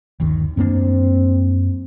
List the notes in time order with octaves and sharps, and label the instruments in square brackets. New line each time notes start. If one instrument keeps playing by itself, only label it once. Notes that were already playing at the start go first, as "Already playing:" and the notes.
[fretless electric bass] G1 D#2 D#3
[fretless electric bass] F#2 A#3 D4 [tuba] C4